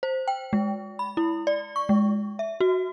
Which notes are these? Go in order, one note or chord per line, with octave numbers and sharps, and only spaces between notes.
C5
G5
G#3
B5
E4
D5
C#6
G#3
E5
F#4